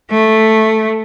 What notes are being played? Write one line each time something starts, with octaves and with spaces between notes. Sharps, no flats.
A3